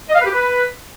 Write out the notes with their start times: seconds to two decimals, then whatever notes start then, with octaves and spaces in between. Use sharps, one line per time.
0.09 D#5
0.15 F5
0.20 B4
0.26 G4
0.32 B4